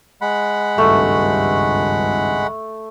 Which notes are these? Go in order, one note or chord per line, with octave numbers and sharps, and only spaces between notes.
G#3 F#5 B5
G#1 C#2 G2 A3